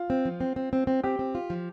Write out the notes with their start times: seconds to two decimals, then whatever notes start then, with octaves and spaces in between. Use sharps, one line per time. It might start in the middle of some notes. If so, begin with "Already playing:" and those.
Already playing: F4
0.10 C4
0.25 F3
0.41 C4
0.56 C4
0.73 C4
0.87 C4
1.03 C4 G4
1.19 C4
1.35 F4
1.50 F3